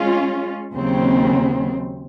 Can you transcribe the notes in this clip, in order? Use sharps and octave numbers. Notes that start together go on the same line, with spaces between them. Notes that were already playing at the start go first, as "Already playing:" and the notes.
Already playing: G#3 C#4 F4
D#2 C#3 F#3 C4